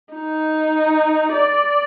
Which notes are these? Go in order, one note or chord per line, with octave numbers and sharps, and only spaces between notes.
D#4
D5